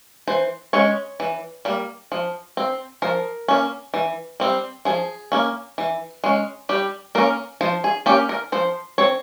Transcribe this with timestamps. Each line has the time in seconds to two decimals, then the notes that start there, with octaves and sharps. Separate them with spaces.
0.27 E3 C5
0.73 G#3 C#4 C#5
1.20 E3
1.65 G3 A#3
2.12 F3
2.57 C4
3.02 F3 A#4
3.48 A#3 C#4
3.94 E3
4.40 G3 C4
4.85 F3 G#4
5.32 A#3 C#4
5.78 E3
6.24 G#3 C#4
6.69 G3 G4
7.15 A#3 C#4 A#4
7.61 F3 C5
7.84 G#4
8.06 A#3 C#4 G4
8.29 A#4
8.52 F3 C5
8.98 C4 C#5